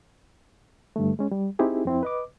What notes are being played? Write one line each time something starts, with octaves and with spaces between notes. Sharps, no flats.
G2 D3 A3
G#3 C#4
G3
C4 D#4 E4 G4 G#4
F2 C4 E4
B4 D#5 D6